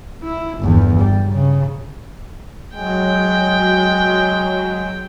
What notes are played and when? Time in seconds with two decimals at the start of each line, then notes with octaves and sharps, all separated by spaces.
0.23 E4
0.59 G1 E2
1.01 G3
1.31 C#3
2.75 F#3 G#3 G5